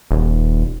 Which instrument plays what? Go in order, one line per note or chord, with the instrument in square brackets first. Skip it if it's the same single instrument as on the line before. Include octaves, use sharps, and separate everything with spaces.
[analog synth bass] D#1